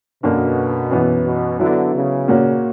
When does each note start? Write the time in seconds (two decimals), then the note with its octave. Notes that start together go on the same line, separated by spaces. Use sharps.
0.23 F#2 B2 D3 A#3
0.91 F#2 E3 B3
1.25 B2
1.59 D3 F#3 B3 E4
1.94 C#3
2.28 A#2 A#3 C#4 F#4